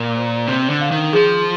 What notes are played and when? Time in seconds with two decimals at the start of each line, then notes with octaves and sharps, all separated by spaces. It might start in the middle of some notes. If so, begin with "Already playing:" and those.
Already playing: A#2
0.16 C5
0.48 C3 C5
0.70 D3
0.81 F5
0.91 D#3
1.13 F3 G#4